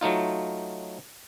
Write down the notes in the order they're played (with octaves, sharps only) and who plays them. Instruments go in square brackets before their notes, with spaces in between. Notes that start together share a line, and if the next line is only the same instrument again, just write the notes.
[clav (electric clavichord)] F#3 A3 D#4 F4